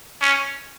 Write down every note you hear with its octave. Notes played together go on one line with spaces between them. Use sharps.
C#4